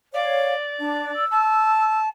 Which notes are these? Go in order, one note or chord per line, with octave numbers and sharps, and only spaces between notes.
C#5 D5 F5
D4 A5
E6
A5